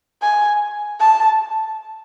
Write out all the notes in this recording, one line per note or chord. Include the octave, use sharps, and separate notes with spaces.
G#5
A5